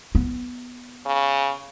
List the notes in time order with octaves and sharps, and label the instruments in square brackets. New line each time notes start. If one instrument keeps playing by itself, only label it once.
[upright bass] B3
[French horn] C#3